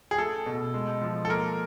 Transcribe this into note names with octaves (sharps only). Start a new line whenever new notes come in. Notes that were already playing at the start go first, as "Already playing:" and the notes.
G#4
A3 A4
B2
G#3
F3
A4
A#3 A#4